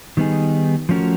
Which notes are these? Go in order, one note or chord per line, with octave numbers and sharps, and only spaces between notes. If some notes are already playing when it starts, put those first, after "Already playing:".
D#3 G3 B3 D#4 G#4
F3 A3 C#4 F#4 A#4